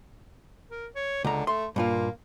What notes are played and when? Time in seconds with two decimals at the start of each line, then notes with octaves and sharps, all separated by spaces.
0.71 A#4
0.96 C#5
1.24 C#2 D3 A#5
1.47 A3 C6
1.76 G2 A#2 A#3 F4